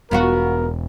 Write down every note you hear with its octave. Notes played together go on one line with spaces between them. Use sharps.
E1 B3 F4 F#4 A#4